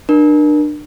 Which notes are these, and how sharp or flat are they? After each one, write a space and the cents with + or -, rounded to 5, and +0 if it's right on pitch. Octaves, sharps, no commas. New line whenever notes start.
D4 +30 A#4 +30